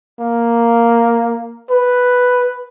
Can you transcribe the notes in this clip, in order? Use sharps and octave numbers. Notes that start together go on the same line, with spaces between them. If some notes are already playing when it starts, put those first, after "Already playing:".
A#3
B4